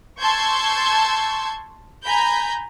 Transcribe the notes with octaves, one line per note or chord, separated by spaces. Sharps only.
A5 C6 C#6 E6 G6 G#6
G#5 A#5 B5 G6